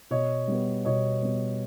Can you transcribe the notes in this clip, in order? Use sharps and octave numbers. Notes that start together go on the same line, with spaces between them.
B2 C#5 D#5
G3 B3
B2 C#5 D#5
G3 B3